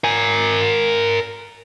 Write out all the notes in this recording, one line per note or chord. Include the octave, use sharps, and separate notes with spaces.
A#4 G#5